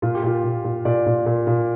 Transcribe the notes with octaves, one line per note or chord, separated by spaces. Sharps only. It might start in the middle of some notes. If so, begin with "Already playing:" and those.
A#2 F4
G4
A#2 F4
A#2
A#2
A#2 D5
A#2
A#2
A#2